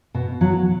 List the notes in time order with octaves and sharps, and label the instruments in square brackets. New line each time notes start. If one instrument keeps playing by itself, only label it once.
[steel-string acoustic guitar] B2
F#3